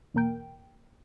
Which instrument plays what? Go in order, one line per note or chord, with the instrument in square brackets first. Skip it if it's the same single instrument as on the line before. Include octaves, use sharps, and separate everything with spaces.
[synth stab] E2 B2 A#3 A#4 G5